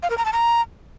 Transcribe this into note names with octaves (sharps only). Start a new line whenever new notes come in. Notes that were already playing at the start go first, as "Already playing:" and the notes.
F5
A#4
A#5
A5
A#5